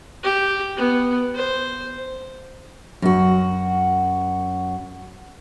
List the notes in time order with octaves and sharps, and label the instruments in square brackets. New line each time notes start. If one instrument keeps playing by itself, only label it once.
[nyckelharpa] G4
B3
C5
[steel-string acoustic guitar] F#2 F#4